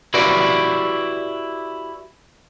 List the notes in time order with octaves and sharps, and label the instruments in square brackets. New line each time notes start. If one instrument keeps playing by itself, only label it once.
[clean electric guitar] E4 F#4 G4 B4 D5